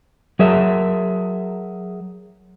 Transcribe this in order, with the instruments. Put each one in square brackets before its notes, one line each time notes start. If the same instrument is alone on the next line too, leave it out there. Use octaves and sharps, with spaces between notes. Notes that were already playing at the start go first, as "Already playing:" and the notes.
[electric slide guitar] F#3 G#4 A#4 E5